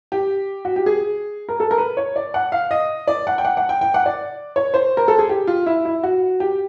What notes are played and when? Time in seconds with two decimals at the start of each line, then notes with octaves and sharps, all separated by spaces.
0.12 G4
0.65 F#4
0.76 G4
0.86 G#4
1.49 A#4
1.60 A4
1.71 A#4
1.78 B4
1.97 C#5
2.16 D5
2.34 F#5
2.52 F5
2.71 D#5
3.08 D5
3.27 F#5
3.38 G5
3.45 F#5
3.57 F#5
3.69 G5
3.81 G5
3.94 F#5
4.06 D5
4.56 C#5
4.74 C5
4.97 A#4
5.08 A4
5.19 G#4
5.29 G4
5.47 F4
5.66 E4
5.85 E4
6.03 F#4
6.40 G4